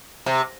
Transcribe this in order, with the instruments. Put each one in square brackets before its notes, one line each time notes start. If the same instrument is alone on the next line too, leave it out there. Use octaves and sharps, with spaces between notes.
[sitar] C3